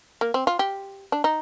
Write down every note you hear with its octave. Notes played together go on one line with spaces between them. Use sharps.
A#3
C4
F4
G4
D4
D#4